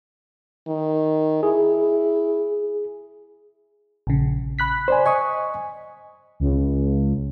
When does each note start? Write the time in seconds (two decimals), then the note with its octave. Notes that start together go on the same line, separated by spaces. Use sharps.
0.67 D#3
1.43 E4 G#4
4.07 A#1 C#3
4.59 B5 F#6 B6
4.88 C5 D5 G#5
5.06 D#5 G#5 C#6 D#6
6.40 C#2